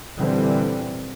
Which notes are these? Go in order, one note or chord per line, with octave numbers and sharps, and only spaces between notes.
A#2 D3 E3 G3 C4